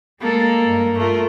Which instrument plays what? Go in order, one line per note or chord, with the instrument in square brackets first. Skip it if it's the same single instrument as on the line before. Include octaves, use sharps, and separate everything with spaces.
[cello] G#3 A4 [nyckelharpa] A#3
[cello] G2
[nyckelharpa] A3 A#4 [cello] F4